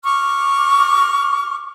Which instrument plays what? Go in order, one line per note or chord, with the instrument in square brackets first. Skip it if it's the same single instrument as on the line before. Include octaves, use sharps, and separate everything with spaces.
[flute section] C#6 D6 F6